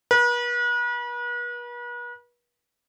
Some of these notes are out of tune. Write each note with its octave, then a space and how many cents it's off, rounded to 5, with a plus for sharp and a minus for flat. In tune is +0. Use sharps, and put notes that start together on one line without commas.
B4 -40